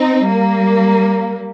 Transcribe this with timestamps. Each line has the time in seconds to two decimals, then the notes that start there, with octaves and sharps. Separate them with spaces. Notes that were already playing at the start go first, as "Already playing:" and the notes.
Already playing: C4 D#4
0.28 G3 A#3